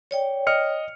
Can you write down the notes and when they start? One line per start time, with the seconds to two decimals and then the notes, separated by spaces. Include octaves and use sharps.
0.11 C#5 D5 G5
0.47 D#5 F6 C#7